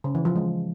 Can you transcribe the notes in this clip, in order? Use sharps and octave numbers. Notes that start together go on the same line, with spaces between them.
C#3
E3
F3
G#3